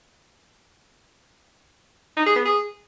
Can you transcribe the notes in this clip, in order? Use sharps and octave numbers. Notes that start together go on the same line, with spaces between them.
D#4
G#4
B3
G#4